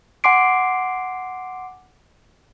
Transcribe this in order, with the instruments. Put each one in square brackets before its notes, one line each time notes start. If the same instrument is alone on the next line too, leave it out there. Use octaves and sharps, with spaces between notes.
[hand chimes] F#5 G#5 C6 D6 C7 D7